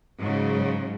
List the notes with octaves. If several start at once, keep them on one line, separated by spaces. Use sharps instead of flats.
G#2 C#3 F#3